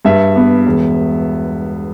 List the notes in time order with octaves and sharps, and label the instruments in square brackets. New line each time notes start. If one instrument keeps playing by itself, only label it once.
[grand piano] G2 E5
B3
E1